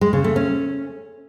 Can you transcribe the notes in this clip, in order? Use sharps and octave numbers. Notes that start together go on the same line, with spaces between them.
G#3
C#3
A3
C#4